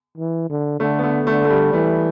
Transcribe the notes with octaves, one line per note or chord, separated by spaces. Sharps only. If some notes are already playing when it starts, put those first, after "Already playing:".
E3
D3
D3 A3
B3
A3
D3 A3
A3
G3
E3 A3